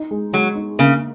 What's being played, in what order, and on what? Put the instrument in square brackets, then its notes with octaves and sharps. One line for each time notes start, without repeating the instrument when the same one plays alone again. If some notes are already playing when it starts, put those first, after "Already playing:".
Already playing: [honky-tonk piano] D#4
G#3
[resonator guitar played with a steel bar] F#3 [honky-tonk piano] G#3
[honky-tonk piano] D#4
[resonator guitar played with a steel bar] C#3 [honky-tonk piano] A#3